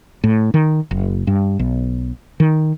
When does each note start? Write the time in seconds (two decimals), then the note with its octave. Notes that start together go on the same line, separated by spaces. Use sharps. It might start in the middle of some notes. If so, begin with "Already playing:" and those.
0.24 A2
0.54 D#3
0.91 F#1
1.27 G2
1.59 B1
2.40 D#3